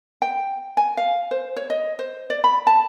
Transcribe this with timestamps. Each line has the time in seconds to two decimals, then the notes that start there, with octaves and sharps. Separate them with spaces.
0.22 G5
0.77 G#5
0.97 F5
1.31 C5
1.56 C#5
1.70 D#5
1.99 C5
2.30 D5
2.44 B5
2.67 A5